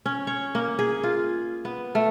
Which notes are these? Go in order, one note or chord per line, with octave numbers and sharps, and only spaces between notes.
C#4
C#5
A#3
G#4
F4
B3
A3